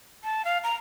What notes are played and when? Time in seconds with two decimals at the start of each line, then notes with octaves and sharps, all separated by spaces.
0.24 A5
0.45 F5
0.64 A#5